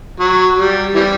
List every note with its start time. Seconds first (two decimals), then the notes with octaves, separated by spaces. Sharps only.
0.20 F#3
0.58 G3
0.95 E3 G3